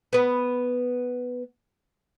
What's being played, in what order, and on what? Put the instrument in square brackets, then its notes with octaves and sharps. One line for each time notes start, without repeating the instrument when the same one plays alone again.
[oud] B3 B4